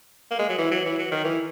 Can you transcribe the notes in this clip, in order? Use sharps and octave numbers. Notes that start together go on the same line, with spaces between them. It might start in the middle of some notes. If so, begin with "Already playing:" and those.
A#3
G#3
F#3
E3
F#3
E3
F#3
D#3
E3